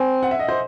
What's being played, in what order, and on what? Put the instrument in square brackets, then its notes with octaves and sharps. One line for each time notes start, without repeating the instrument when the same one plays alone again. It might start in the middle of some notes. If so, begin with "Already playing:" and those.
Already playing: [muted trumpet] C4 [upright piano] G#5
[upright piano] F#5
E5
D#5
C5